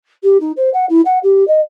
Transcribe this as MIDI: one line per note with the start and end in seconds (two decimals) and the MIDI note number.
0.23 0.37 67
0.40 0.51 63
0.56 0.69 72
0.73 0.85 78
0.89 1.01 64
1.05 1.18 78
1.23 1.46 67
1.47 1.60 75